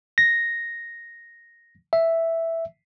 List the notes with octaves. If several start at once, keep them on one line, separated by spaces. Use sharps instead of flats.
A#6
E5